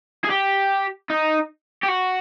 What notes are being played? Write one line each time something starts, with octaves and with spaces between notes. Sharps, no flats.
G#4
G4
D#4
G4
F#4